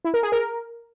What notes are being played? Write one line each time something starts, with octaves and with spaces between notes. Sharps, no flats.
E4
A#4
G#4
A#4